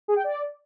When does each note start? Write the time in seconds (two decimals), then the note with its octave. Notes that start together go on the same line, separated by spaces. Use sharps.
0.08 G#4
0.16 G5
0.24 D5